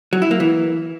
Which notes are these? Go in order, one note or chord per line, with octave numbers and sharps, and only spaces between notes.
F#3
E4
A#3
E3